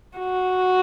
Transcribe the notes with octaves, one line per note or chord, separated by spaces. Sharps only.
F#4